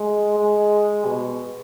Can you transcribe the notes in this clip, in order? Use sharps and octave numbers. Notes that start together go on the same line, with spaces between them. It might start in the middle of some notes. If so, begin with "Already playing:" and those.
Already playing: G#3
G#3
B2